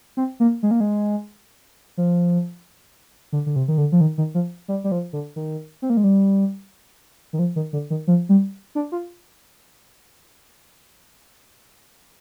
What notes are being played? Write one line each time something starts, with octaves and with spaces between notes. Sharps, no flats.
C4
A#3
G#3
A#3
G#3
F3
D3
D3
C3
D#3
D3
F3
D#3
D#3
F3
G3
G3
F3
D3
D#3
C4
A#3
G#3
G3
D#3
F3
D#3
D3
D#3
F3
G3
D4
F4